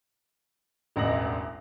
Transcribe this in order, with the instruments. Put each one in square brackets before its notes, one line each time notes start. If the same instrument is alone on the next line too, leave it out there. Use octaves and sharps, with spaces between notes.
[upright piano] E1 A1 D2 D#5 A#6 F#7